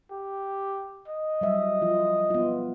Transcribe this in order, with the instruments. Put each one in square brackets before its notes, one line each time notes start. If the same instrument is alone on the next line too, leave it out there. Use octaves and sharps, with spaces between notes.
[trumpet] G4
D#5
[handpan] F#3 G3 E5
F3 F4
B3 F4